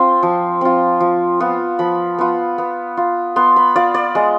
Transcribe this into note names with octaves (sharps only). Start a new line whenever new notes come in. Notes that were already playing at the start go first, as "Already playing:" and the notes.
Already playing: C4 F4 C6
F3
C4 F4
F3
B3 F4
F3 B5
B3 F4
B3
F4
B3 C6
B5
F4 D5
D5
G#3 D#5